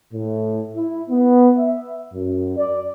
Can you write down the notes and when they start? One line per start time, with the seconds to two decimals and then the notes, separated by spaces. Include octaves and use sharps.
0.13 A2
0.75 E4
1.09 B3
1.58 E5
2.14 F#2
2.57 D5